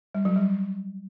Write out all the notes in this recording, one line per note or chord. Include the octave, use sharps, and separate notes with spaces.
G3
F#3
G3